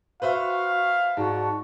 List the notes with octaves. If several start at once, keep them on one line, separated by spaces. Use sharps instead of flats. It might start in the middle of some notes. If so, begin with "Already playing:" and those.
F#4 B4 C5 E5 F5
G#2 F#4 D5 A5